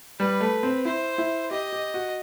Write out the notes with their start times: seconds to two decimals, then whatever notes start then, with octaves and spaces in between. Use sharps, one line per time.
0.19 G3 B4
0.40 A3
0.63 C4
0.85 E4 C5
1.18 E4
1.51 G4 D#5
1.73 G4
1.94 F#4